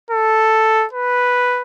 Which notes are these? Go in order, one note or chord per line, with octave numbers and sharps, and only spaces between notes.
A4
B4